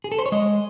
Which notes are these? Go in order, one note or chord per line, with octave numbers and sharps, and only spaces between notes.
G#4
A4
C5
C#5
G#3 D#5